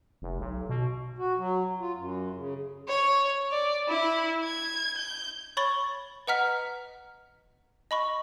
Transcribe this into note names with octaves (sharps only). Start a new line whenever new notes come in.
F1
B1
B2
F#4
F#3
F4
F#2
C#3
C#5
D5
E4
G#6
G6
C#5 B5 C#6 A6 G7
B4 D#5 F#5 A#5 F6 B6
D#5 B5 C#6